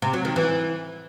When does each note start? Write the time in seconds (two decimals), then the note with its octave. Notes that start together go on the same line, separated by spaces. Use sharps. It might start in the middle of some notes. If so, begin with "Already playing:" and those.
0.02 C3
0.13 F#3
0.25 D#3
0.36 E3